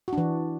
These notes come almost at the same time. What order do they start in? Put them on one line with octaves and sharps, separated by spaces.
F#4 D4 E3